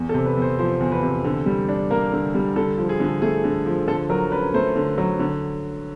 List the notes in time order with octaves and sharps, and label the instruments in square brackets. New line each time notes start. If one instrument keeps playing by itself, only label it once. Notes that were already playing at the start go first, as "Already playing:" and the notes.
Already playing: [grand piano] E2
A4
C3
B4
E2
C5
F3 C5
E2
B4
C3
D3
G3
D4
A#3 A#4
D3
G3
D3 A4
F3
G#4
D3 G#4
A3 G#4
D3
F3
D3 A4
F#3 A#4
C#4 B4
A3 C5
D3
F#3
D3